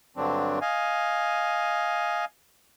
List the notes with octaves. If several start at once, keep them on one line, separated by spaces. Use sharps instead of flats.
G2 D3 F#3 C4 D4
D#5 F5 G#5